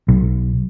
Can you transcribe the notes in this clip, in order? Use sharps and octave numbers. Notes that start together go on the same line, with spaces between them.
B1